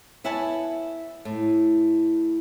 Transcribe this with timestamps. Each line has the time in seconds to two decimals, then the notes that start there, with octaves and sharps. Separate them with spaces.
0.24 B3 E4 C#5 F#5 G#5 A5
1.25 A2